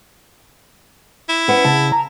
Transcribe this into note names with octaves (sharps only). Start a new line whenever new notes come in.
E4
B3 C#4
C#3 A5
A#5